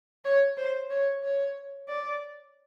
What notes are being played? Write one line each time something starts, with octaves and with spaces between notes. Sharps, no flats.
C#5
C5
C#5
C#5
D5